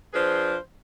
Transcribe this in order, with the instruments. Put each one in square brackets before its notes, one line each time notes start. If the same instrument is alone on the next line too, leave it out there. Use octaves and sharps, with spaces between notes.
[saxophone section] F3 D4 G#4 B4 C5